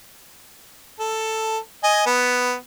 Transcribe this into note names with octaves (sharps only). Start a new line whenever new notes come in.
A4
D#5 G#5
B3